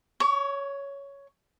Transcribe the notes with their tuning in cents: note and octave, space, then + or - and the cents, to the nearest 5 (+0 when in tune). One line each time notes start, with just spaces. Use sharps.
C#5 +10 C#6 +45